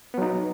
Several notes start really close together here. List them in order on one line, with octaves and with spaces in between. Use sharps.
B3 F#3 D#4 F#4